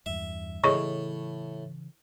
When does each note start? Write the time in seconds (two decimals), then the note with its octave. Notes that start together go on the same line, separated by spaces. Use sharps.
0.06 E2 G2 E5
0.64 A2 C#3 E3 G#4 C#5 D#5 C#6